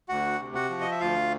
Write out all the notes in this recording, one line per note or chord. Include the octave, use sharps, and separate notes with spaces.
D2 F#4 F#5
C3
F#4 F#5
F3
D#5
E5
D2 F4 F5